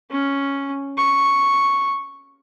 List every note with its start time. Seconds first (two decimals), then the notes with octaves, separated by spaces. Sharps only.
0.11 C#4
0.97 C#6